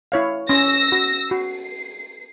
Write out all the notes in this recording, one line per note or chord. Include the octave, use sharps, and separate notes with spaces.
E4 C#5 F5
C#4 E6 A#6
F#4
F#4 C7